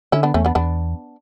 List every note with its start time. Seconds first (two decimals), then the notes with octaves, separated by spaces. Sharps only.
0.12 D3 C#4 E4
0.23 B3 D4
0.34 E2 A3 C#4
0.45 B3 D4
0.55 E2 B3 D4